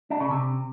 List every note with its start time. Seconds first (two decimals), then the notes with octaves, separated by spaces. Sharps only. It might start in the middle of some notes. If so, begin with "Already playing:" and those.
0.10 D4
0.20 C#3
0.30 C3